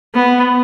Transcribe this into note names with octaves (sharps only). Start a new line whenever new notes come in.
B3